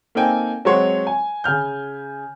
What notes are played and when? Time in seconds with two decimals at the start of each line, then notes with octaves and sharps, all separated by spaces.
0.15 A#3 C4 D#4 A4 G5 G#5
0.65 F#3 G#3 C4 F#4 C#5 C6
1.07 G#5
1.44 C#3 G#5 F6 G6